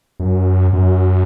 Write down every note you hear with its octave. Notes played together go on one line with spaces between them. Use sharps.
F#2
F#2